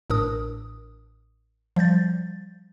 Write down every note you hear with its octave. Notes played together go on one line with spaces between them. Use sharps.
A1 A2 D4 A#4 D#6
F3 G3 G6 A6